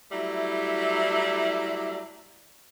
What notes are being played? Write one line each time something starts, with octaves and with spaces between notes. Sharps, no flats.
F#3 G3 A3 E4